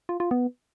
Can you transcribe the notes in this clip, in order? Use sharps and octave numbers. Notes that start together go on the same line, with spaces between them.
F4
F4
B3